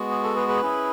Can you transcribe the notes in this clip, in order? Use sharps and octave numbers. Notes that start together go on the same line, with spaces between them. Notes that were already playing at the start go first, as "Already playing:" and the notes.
Already playing: G#3 B3 F#4
G#4
A4
G#4 B4
G#4 B4
C#4 E4 G#4